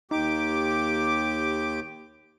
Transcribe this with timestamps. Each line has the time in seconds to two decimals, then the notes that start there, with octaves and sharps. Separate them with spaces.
0.11 D#2 D#4 G4 D6